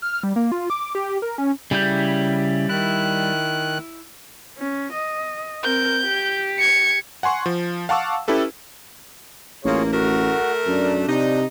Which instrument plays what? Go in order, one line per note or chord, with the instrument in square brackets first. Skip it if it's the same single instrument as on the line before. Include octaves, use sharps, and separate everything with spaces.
[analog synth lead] F6
G3
A#3
F4
D6
G4
G4
A#4
C#4
[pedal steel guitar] C#3 E4 G6 [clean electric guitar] G3
[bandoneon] D#3 F#6 [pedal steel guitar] E4
[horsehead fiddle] C#4
D#5
[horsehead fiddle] C4 A#4 [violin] G6
[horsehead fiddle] G4
[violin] G#6 C#7
[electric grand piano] F#5 G#5 C6 C#6
F3
F5 F#5 A5 C#6 D6 E6
C#4 E4 G4 A4 B4
[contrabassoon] A1 [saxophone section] A#3 [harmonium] F4 G#4 C#5
[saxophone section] A3 A#4 [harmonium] F#4
[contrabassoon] F#2 [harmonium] D4
[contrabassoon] C3 [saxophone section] D#4